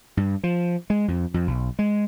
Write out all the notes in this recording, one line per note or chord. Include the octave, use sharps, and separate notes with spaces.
G2
F3
G#3
F2
F2
B1
G#3